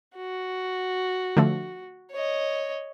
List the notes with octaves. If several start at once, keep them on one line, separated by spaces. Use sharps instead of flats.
F#4
D3 F3 A3
C#5 D#5